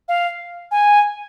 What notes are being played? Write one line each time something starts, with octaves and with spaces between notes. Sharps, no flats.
F5
G#5